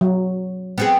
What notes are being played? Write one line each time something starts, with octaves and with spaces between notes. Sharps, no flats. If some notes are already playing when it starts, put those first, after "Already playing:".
F#3
B3 C4 G#4